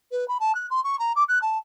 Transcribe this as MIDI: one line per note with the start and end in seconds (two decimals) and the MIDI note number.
0.11 0.27 71
0.28 0.38 83
0.40 0.55 81
0.55 0.67 90
0.70 0.83 84
0.84 0.99 85
0.99 1.12 82
1.16 1.24 86
1.29 1.39 90
1.42 1.58 81